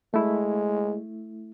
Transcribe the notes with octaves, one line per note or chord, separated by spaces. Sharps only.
G#3 A3 E4